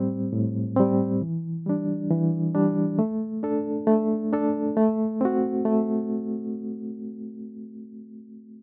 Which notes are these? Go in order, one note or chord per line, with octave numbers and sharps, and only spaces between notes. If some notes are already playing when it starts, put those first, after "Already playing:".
Already playing: A2 G3 C4
A2
G3 C4
E3
G3 D4
E3
G3 D4
A3
D4 A4
A3
D4 A4
A3
C4 F#4
A3